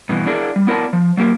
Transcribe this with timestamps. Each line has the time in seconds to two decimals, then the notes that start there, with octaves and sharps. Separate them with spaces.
0.09 G2 B2 E3
0.26 D4 E4 G#4 A#4 D5
0.56 G3
0.67 B3 E4 A#4 D5 A5
0.93 F3
1.17 F#3 A#3 G4 A#4